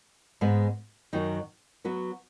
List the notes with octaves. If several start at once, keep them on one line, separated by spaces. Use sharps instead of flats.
G#2 G#3 B3
F#2 D#3 F#3 D#4
F#3 B3 F#4 B4